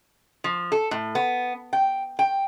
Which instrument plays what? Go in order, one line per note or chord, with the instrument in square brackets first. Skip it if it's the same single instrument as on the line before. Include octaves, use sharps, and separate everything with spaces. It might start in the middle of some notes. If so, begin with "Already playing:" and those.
[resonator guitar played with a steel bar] F3
A4
A2
B3
G5
G5